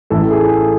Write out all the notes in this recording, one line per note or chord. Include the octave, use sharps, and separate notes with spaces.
A1 A2 E3 A4
A4
G#4
A4